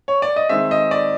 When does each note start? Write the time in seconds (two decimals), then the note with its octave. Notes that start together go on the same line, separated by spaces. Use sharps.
0.08 C#5
0.22 D5
0.36 D#5
0.49 D#3 G#3 C4 E5
0.71 D#5
0.91 D5